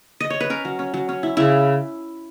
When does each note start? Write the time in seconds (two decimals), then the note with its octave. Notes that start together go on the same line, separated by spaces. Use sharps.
0.20 D#5
0.30 C#5
0.40 B4
0.50 C#4 A#4
0.65 F#3
0.79 C#4
0.94 F#3
1.09 C#4
1.23 E4
1.37 C#3 E4